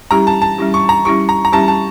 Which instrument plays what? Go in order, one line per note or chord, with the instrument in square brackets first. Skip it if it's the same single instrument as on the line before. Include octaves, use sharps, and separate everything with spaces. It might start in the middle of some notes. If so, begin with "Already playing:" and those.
[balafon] G3 C#4 E4 G4 [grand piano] A#5
[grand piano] A5
A5
[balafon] G3 C#4 E4 G4
[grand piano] C#6
A#5
[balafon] G3 C#4 E4 G4 [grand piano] C#6
[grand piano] A#5
A#5
[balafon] G3 C#4 E4 G4 [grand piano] A5
[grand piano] A5